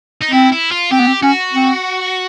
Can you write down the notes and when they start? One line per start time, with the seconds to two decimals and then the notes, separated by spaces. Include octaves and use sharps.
0.21 D#4
0.31 C4 E4
0.52 E4
0.71 F4
0.92 C4 G4
1.00 B3
1.07 C4
1.23 C#4 F#4
1.53 C4